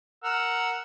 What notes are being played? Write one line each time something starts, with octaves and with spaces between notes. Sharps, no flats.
A#4 F#5 E6